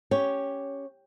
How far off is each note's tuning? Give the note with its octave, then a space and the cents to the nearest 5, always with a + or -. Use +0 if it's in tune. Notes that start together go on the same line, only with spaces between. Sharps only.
C#4 +0 G4 +5 C#5 +0